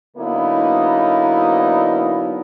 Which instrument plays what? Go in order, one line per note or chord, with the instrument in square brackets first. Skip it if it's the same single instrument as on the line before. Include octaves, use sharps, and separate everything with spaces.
[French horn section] D3 F#3 A#3 B3 D#4 E4